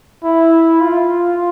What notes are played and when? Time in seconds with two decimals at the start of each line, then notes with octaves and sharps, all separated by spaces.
0.24 E4
0.81 F4